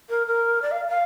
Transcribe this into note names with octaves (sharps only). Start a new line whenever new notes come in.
A#4
A#4
D5
F5
F5